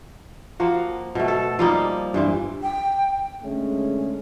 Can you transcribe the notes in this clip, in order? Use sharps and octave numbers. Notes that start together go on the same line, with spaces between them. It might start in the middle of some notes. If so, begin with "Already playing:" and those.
F3 A#3 F#4
B2 A3
A4
F3 G3 A#3 D#4
G2 E3 C4
G5
D3 G#3 A3 C#4